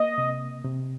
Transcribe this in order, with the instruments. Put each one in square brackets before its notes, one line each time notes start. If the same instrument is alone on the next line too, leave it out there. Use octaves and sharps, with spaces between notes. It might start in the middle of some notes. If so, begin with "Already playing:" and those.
Already playing: [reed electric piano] A#3 [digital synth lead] D#5
[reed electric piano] C3
C3